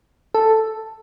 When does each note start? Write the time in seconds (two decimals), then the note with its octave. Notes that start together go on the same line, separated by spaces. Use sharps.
0.34 A4